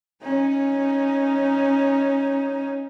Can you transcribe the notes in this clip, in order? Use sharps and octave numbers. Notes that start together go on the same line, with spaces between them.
C#4 D#4